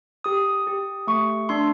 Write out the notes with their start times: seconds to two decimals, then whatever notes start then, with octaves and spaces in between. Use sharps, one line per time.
0.24 G4 D#6
0.67 G4
1.07 A3 C#6
1.49 D4 C6